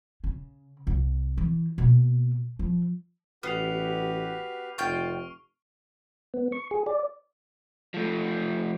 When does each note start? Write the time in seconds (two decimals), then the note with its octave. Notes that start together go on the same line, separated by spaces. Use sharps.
0.24 C#3
0.87 C2
1.37 E3
1.78 B2 A#3
2.59 F3
3.43 A1 B3 F#4 G4 B4 F6 C7 F7
4.78 F1 F4 G5 C#6 F6 D7
6.34 B3
6.52 C#6
6.71 G#4
6.86 D5
7.94 F3 A3